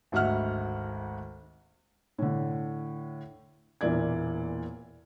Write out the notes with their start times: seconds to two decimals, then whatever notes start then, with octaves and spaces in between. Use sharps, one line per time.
0.12 G#1 D2 F#4 E5 F#5 F6
2.18 A2 D3
3.81 E1 A#2 E3 A#3 D5 G#6